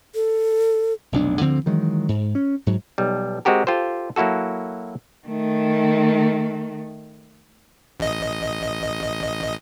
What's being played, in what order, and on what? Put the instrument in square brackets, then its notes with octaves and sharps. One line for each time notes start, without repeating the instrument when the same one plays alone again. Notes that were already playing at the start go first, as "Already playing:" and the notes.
[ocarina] A4
[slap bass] F1 B1 D4
D2 D3 F3 C4
D#3 E3 F#3 G#3
G#2
C#4
G#2 F#3
[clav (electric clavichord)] B1 G3
G#3 C4 F#4 G4 A#4
F4 G4 A4 C5
F#3 A#3 E4 F#4 A4
[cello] D#3 A3
[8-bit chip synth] A1 D#5